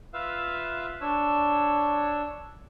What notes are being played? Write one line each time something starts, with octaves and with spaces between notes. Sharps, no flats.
F4 B4 E5 F5 E6
D4 C#5 E6